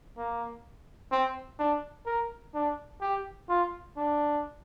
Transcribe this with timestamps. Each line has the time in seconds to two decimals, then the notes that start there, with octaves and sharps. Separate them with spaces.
0.17 A#3
1.12 C4
1.59 D4
2.06 A#4
2.54 D4
3.01 G4
3.49 F4
3.97 D4